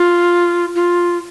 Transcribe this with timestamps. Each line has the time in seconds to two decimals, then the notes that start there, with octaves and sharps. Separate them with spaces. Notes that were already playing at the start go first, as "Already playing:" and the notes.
Already playing: F4
0.75 F4